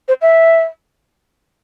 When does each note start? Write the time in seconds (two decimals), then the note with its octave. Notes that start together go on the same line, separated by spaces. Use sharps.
0.08 C5
0.22 E5